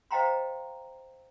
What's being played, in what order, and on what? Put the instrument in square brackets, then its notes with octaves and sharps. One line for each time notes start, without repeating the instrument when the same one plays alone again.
[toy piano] C5 D#5 F5 G5 A#5 C6